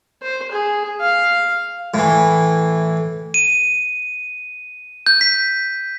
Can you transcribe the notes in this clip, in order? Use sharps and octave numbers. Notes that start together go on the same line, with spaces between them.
C5
G#4
F5
A2 E3
D#7
G6
B6